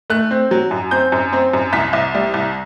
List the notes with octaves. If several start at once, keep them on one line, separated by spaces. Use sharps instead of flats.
A3 F#6
C4
F#3
F#2
C4 G6
F#2
C4
F#2
C2 B6
C2
G3
C2